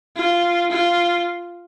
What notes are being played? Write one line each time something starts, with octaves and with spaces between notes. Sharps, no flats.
F4
F4